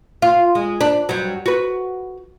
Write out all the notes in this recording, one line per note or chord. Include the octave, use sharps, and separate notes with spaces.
F4
G#3
D4
G2 F#3
F#4 B4